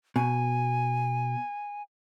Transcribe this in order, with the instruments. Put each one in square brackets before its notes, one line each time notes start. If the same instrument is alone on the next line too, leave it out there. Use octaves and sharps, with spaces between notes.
[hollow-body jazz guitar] B2 [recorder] G#5